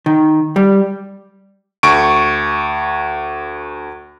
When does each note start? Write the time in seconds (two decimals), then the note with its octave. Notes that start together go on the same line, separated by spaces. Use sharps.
0.06 D#3
0.56 G3
1.83 D2 C#6 D7